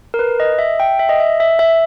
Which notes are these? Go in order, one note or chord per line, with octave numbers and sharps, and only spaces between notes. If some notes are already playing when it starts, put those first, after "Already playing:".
A#4
B4
D#5
E5
G5
E5
D#5
E5
E5
E5